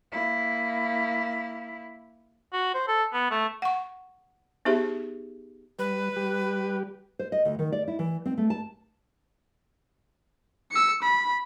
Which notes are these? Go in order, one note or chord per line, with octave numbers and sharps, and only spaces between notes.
A#3 E4
F#4
C5
A4
B3
A3
F#5 C#6
B3 D#4 G4 G#4 C5 E5
G3 B4
G3 G4
C5
D#5
D2
D#3
D5
E4
E3
C4
A3
A5
E6 C#7
B5